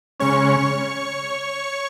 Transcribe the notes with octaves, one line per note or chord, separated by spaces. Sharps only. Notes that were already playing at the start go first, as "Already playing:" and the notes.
C#3 G#3 C#4 C#5 C#6